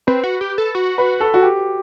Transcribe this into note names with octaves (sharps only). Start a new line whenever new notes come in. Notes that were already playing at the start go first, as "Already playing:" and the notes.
C4 B4
F#4
G4
A4
F#4
B4
A4
F#4
G4